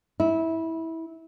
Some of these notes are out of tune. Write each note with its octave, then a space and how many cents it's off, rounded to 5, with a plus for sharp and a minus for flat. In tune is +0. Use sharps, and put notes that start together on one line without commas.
E4 -20